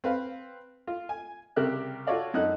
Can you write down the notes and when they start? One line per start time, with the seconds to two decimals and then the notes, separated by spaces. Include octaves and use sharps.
0.04 C4 B4 F5
0.87 F4
1.09 G#5
1.56 C2 C#3 G4 A#4 E5 F#6
2.07 F4 F#4 A4 C#5 D5 F5
2.34 F#2 D#4 A4 F#6